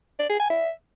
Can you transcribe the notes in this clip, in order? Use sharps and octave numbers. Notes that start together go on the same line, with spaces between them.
D5
G#4
G#5
E5